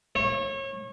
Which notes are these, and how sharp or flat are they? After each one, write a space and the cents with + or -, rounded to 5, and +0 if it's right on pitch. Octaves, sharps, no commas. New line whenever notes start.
C#5 -30